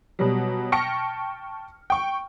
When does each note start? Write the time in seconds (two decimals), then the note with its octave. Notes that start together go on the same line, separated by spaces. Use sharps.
0.19 B2 F#3 G3
0.72 G5 A5 C#6 F6 A#6 C#7
1.90 G5 C#6